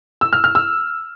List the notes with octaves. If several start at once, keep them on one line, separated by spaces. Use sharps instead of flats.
E6
F6
F6
E6